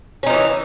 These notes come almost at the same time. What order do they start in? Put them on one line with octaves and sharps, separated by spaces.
C#4 D#4 F3 E3